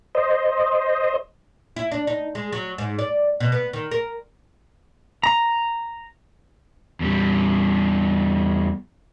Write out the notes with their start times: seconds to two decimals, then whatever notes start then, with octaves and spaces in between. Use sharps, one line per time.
0.15 C5 D#5
1.76 E4
1.92 D4
2.07 D#4
2.35 G#3
2.52 F#3
2.78 G#2
2.99 D5
3.40 B2
3.52 B3
3.73 D#3
3.91 A#4
5.24 A#5
7.00 E2 G3